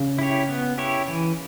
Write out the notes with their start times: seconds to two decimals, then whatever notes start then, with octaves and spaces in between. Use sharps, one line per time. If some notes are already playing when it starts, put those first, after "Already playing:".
Already playing: C#3
0.18 E4 G4 C#5
0.49 B3
0.78 E4 G4 C#5
1.08 E3